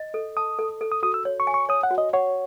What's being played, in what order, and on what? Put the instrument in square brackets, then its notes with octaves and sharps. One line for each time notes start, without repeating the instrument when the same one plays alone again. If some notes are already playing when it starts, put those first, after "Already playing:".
Already playing: [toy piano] D#5
A4
[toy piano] A5 [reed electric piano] D#6
[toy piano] A4
A4
[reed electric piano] D#6
[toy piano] F#4 [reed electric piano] D#6
[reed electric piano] E6
[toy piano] C#5
[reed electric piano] C#6
[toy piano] G#5
[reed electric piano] C#6
[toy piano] C#5 [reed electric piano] D#6
[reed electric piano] F#5
[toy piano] F#4
[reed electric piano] D#5
[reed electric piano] C#5 [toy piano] F#5